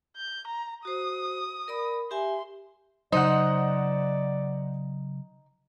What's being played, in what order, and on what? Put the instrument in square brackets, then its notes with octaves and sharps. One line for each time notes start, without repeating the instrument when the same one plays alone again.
[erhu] G6
A#5
[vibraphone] F#4 C5 [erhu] D#6
[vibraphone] A#4 D5 B5
[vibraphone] G4 E5 G#5 [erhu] C6
[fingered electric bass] C#3 F#3 [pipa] D#4 [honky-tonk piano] C5 D#5 F#5 [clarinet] D5